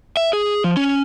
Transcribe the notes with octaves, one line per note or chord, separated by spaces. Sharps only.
E5
G#4
F3
C#4